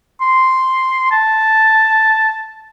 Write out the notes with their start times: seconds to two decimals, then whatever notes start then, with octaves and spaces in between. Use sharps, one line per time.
0.21 C6
1.12 A5